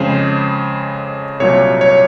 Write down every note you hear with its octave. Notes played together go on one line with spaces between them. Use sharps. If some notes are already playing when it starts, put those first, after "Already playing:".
Already playing: F2 C#3 G#3 C5
C2 A#2 F#3 C#5
C#5